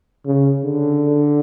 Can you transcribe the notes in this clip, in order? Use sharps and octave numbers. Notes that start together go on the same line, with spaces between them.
C#3
D3